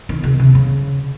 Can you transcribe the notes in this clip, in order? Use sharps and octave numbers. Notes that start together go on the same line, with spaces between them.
D#3
C#3
C3
C#3